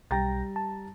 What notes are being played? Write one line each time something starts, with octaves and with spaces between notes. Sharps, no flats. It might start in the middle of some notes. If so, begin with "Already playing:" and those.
B1 G3 G5 A#5 A6 A#6
A5